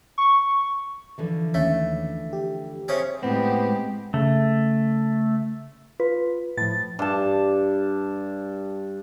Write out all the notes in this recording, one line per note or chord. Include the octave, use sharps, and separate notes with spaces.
C#6
D3 E3 F3
D#2 A3 C#4
G4
C3 C#4 G#4
A2 G#3 B3 C4 G4
C#3 A3
F4 B4
A2 F3 A6
G2 A5